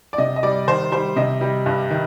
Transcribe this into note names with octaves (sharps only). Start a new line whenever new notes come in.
D5
C3 D#5
D#5
G3 D5
D#3 C5
G3 C5
C3 D#5
G3
G2
D#3